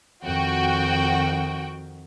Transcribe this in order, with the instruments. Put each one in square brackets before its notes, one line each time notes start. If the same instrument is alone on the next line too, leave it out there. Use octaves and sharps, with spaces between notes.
[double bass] F2 D#3 [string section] F#4 G5